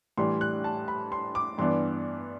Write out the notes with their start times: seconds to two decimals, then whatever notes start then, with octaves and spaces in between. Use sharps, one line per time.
0.18 A2 E3 G3 D4 C6
0.41 F#6
0.64 A5
0.88 B5
1.12 C6
1.35 D6
1.58 G2 E3 B3 D4 C6